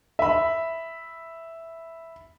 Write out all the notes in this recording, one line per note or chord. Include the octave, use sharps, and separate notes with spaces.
E5 B5